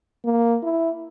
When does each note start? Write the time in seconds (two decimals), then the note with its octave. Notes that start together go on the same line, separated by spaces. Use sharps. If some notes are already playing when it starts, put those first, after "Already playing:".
0.24 A#3
0.63 E4